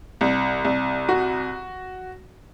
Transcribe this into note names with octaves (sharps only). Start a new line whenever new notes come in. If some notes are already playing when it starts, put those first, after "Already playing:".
C2
C2
F#4